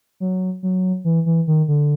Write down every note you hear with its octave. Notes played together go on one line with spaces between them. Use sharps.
F#3
F#3
E3
E3
D#3
D3